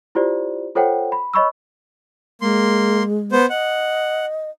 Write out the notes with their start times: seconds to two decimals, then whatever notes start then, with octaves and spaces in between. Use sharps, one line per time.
0.15 E4 F4 G4 C5 D5
0.75 F4 A4 C5 C#5 F#5 G5
1.12 B5
1.34 C#5 D#5 B5 C#6 E6
2.41 G#3 A#3 C6
3.32 B3 C5
3.50 D#5 F#5